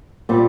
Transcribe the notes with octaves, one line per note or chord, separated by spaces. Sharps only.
A#2 G3 C4